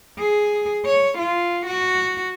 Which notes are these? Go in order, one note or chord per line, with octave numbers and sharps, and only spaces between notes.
G#4
C#5
F4
F#4